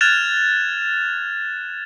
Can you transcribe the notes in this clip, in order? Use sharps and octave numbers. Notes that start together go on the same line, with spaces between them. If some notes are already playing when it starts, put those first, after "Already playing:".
F6 F#6 G#6 A6 E7 F7